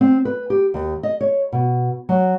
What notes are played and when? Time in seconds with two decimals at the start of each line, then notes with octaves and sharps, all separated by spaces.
0.01 C4
0.25 B4
0.50 G4
0.74 D#2
1.03 D#5
1.21 C#5
1.52 B2
2.09 F#3